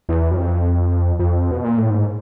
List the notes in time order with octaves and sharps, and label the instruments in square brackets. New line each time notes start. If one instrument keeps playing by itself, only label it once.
[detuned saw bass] E2
F#2
F2
F2
B2
A#2
A2
G#2